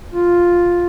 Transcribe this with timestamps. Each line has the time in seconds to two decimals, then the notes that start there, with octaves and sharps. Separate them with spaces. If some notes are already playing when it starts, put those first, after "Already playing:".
0.12 F4